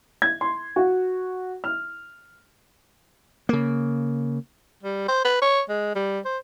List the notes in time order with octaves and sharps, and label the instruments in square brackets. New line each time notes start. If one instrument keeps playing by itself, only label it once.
[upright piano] G#6
C6
F#4
F6
[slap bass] C#3 A#3
[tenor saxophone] G3
C5
B4
C#5
G#3
G3
C5